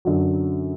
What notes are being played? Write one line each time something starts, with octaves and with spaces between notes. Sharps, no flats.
F#2 D3 F#3